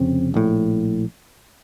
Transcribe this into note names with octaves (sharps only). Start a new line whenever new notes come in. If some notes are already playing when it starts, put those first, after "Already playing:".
Already playing: F1 F2 C#3 C4
A#1 A2